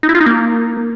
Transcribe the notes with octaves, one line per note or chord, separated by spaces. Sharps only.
D#4
E4
F4
D#4
A#3